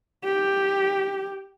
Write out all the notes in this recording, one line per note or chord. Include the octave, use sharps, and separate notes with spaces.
G4